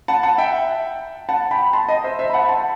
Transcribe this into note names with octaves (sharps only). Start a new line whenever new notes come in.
F#5 A5
F#5 A5
E5 G5
F#5 A5
G5 B5
A5 C6
D#5
C5 E5
C5 E5
B5
F#5 A5
A5 C6